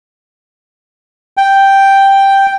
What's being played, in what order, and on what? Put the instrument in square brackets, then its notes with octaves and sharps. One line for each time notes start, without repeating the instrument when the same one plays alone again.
[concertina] G5